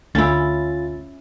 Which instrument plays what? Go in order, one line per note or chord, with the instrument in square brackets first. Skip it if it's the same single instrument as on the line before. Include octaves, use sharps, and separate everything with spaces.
[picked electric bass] D2 [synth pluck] D3 A3 A#3 [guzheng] C#4 E4 [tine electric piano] F4 A6